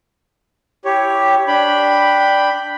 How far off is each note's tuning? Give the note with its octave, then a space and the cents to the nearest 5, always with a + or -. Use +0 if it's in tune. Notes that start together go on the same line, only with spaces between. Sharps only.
E4 +0 G4 +0 C#5 +10
D4 +0 G5 +0 B5 +0